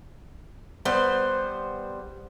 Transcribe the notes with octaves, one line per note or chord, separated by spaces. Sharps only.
G3 B3 C5